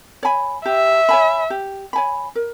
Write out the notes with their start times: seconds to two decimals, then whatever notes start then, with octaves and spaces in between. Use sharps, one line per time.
0.23 C#5 G#5 B5
0.66 G4 E5
1.09 C#5 G#5 B5
1.50 G4
1.93 C#5 G#5 B5
2.35 A#4